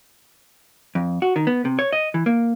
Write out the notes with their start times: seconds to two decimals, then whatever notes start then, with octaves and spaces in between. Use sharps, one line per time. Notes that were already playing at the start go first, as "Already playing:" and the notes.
0.95 F2
1.22 F#4
1.36 D#3
1.47 B3
1.65 C3
1.79 C#5
1.93 D#5
2.14 E3
2.26 A#3